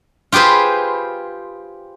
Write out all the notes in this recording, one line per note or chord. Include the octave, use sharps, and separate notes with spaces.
F4 G4 G#4 B4 C5